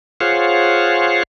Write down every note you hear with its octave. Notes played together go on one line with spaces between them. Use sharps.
F4 G#4 C5 C#5 F5 F#5